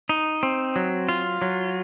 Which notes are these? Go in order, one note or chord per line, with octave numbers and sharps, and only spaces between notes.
D#4
C4
F#3
F4
F#3